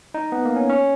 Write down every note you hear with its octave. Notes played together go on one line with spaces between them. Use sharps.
D#4
B3
A#3
C#4
C#4